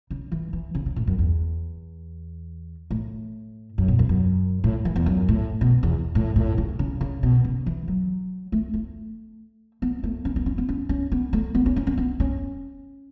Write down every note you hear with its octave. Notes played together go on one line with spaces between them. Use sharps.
C#3
E3
E3
C#3
C#3
A2
F#2
E2
A2
F#2
B2
E2
F#2
A2
E3
E2
F#2
A2
B2
E2
A2
A2
C#3
C#3
C#3
B2
C#3
E3
F#3
A3
A3
B3
A3
C#4
B3
C#4
B3
C#4
C#4
B3
A3
B3
C#4
C#4
C#4
B3
C#4